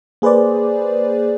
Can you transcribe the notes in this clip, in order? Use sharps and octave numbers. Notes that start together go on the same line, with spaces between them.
A#3 G#4 B4 C5 D5